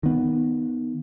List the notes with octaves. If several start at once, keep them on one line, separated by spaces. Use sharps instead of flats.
D#3 B3